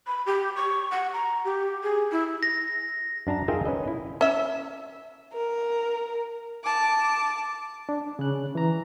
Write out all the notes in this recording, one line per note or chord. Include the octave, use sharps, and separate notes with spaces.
B5
G4
C#6
F#5
A#5
G4
G#4
E4
A#6
F#2 D4 A5 A#5
D#4 F4 G#4 A#4 E5 G5
C#4 B4 D#5
E4
C#4 E5
A#4
A5 D6
D4
C#3 F#6
E3 A#5